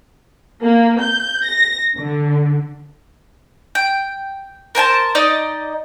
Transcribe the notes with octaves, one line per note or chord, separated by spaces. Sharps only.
A#3
G6
A#6
D3
G5
A#4 C5 G#5 A5
D#4 D5 D#5